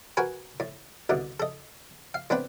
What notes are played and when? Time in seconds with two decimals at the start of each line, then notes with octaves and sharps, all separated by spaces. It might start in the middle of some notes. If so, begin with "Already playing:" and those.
0.17 F#4 A#4 B4 G#5
0.60 A2
1.09 C2 B2 D3
1.40 A4 D#5
2.14 F5
2.30 A2 B3 C4 D4 B4